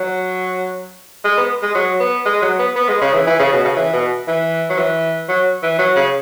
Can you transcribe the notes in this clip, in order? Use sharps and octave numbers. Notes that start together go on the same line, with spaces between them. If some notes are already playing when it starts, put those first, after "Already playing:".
Already playing: F#3
G#3
B3
G#3
F#3
B3
G#3
F#3
B3
B3
G#3
C#3
E3
E3
C#3
B2
C#3
E3
B2
E3
F#3
E3
F#3
E3
F#3
C#3